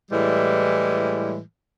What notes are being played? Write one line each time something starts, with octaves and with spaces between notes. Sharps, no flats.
A2 E3 G3 G#3